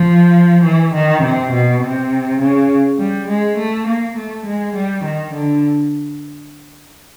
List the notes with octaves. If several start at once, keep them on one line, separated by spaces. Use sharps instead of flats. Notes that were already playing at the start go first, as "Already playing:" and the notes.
Already playing: F3
E3
D#3
C3
B2
C3
C#3
G3
G#3
A3
A#3
A3
G#3
G3
D#3
D3